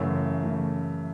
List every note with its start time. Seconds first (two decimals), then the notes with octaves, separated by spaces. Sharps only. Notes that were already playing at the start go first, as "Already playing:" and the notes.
Already playing: F#2 C#3 E3 A3
0.43 C#3 E3 A3